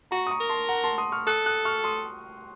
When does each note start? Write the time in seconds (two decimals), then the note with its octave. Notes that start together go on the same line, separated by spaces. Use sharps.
0.11 F#4 A#5 C#6
0.27 D#6
0.30 A#5 C#6
0.40 A#4
0.49 A5 C6
0.69 F#5 A#5
0.84 A5 C6
0.98 C6 D#6
1.12 C#6 F6
1.27 A4 D#6 F#6
1.46 D#6 F#6
1.65 C#6 F6
1.84 C6 D#6